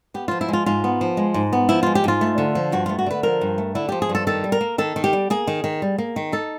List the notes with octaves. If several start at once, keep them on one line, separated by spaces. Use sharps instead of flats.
B3 G4
F3 F4
E4
G#3 F4
G#2 F4
B3
F3
G#3
G#2
B3
F3 E4
G#3 F4
G4
G#2 F4
A3
D3
F3
G2 F#4
A3 F4
F#4
D3 B4
F3 A#4
G2
A3
D3 E4
F3 G4
G#4
G2
A4
D#3 A4
G3
A#4
A#3
D#3 A4
D#3
G4
G3
A#3 G#4
D#3
D#3
G3
A#3
D#3
D#4 A4